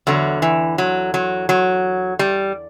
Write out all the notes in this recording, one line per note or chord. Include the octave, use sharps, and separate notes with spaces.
E2 D3 F#3
E3
F#3
F#3
F#3
G3